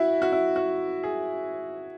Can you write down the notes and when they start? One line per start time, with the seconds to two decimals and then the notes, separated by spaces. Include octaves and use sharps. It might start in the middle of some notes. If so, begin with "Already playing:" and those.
Already playing: E4 F#4
0.22 F#4
0.32 E4
0.56 F#4
1.03 G#4